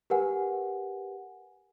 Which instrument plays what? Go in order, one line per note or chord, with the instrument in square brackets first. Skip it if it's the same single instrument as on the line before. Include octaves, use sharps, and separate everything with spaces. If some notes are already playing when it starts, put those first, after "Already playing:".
[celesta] G4 A#4 B4 F#5 G#5